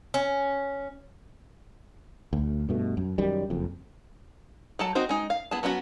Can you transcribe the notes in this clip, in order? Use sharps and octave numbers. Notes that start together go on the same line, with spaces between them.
C#4
D2
G2 B2 A3
F#2
F#2 D#3 G3
F#1 F2
F#3 A4 A5
C4 D#4 F#4 C5
G#3 D#4
F5
B3 E4 G#4 A5
F#3 B3 C#4 E4 F#4